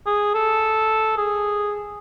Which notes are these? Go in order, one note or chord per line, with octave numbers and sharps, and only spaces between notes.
G#4
A4
G#4